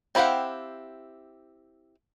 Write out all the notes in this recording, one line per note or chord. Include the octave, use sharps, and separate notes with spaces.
C4 E4 G4 F5 F#5